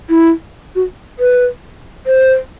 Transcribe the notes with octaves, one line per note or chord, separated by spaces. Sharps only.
E4
F#4
B4
C5